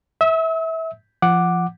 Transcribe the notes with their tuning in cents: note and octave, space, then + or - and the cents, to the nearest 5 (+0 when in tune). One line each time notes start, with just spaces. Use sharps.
E5 -20 E6 -45
F3 -20 F#5 +0 D6 +0